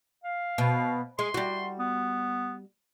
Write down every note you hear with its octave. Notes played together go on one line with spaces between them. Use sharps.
F5
B2
G#3 C6
G3 F#4
B3